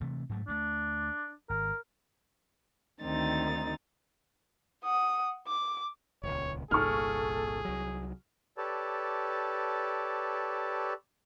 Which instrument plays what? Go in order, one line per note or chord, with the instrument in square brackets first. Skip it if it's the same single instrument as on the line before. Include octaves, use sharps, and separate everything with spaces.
[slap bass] C3 E3 A3
G#2 F#3 A3
[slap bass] D2 G3 A3 [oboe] D4
[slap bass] G#1 [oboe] A#4
[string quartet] D2 D#3 C4 D#4 A6
[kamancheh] F#5 D#6
D6
[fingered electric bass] D#1 C#2 [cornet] C#5
[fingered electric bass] G1 C2 A#2 [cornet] G#4 [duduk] A4 [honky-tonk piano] C#6 F6
[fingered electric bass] C2 F#3
[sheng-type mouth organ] G4 A4 B4 C#5 D5 A5